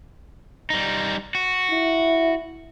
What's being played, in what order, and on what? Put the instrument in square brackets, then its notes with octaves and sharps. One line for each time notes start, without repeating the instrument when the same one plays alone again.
[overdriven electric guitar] G3 D#4
F#4
[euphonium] E4